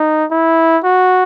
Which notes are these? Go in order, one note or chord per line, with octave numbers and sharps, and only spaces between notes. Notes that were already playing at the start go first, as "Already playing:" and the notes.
Already playing: D#4
E4
F#4